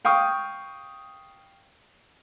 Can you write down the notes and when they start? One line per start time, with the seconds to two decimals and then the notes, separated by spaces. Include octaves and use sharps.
0.05 F5 G5 C#6 D#6